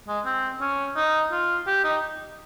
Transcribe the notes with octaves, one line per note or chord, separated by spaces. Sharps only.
G#3
C4
C#4
D#4
F4
G4
D#4